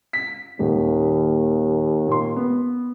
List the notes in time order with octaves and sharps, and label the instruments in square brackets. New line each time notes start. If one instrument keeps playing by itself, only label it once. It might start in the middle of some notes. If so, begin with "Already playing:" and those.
[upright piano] B6
[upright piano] D#1 [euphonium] D#2
[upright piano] A#2 C6
B3